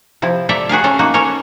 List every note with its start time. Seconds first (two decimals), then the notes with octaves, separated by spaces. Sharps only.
0.22 C3 F3 E4
0.49 A4 D5 E5 A#5
0.69 F#4 G#4 A#4 F5
0.84 C#4 A4 A#4
0.99 A#3 D#4 F#4
1.14 C#4 A4 A#4 C#5